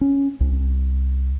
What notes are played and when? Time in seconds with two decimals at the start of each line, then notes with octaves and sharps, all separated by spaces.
0.01 C#4
0.40 C2